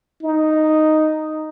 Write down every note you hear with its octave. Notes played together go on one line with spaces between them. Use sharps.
D#4